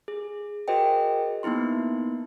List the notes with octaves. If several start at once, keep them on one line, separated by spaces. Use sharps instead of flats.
G#4
F#4 G#4 A#4 C5 D#5 G5
A#3 B3 D#4 E4 C6